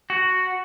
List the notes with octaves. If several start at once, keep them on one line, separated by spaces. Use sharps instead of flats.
F#4